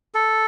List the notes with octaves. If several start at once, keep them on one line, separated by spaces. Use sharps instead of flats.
A4